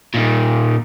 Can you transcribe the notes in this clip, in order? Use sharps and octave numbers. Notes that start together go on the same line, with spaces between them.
A#2 D#3